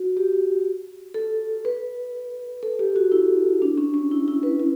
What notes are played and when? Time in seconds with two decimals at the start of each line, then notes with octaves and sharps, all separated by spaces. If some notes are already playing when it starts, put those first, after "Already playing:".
Already playing: F#4
0.17 G4
1.14 A4
1.65 B4
2.63 A4
2.79 G4
2.96 F#4
3.12 E4
3.62 D4
3.78 C#4
3.94 C#4
4.11 E4
4.28 E4
4.43 B4
4.59 B4